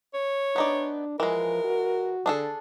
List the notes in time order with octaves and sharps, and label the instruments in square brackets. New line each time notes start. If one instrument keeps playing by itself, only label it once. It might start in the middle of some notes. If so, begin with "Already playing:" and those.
[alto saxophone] C#5
[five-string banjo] B3 D#4 D5 [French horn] D4
[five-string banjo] E3 G#3 [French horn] F3 [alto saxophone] A#4
[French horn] F#4
[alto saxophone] D3 [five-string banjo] D4 G#4 A4